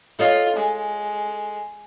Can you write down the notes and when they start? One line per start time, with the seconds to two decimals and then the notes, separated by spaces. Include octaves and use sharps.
0.19 F4 A4 C#5 D#5
0.56 G#3